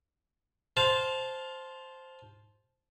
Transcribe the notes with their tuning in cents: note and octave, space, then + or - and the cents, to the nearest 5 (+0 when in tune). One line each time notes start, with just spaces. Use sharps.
C5 +0 F5 +15 A5 -15